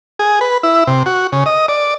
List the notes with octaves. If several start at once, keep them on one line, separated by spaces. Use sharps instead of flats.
G#4
B4
E4
C3
F#4
C#3
D#5
D5